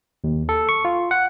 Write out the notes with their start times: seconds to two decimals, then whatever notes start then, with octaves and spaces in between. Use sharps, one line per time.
0.24 D#2
0.49 A4
0.69 C#6
0.85 F4
1.11 F#5